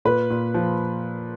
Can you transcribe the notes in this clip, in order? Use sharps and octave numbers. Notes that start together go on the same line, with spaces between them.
A#2 B4
A#2
F3